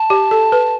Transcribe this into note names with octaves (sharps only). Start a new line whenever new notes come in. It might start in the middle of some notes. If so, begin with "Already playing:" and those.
Already playing: A5
G4
A4
B4